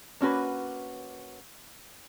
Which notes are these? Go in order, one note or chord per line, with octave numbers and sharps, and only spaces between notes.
A#3 C#4 F#4 B4